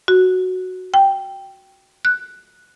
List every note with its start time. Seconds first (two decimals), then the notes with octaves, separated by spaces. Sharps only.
0.08 F#4
0.94 G5
2.05 F#6